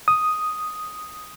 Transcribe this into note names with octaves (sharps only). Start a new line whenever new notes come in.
D#6